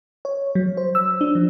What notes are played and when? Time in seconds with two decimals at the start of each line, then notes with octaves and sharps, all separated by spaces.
0.25 C#5
0.55 F#3
0.77 C5
0.95 E6
1.21 D4
1.35 F3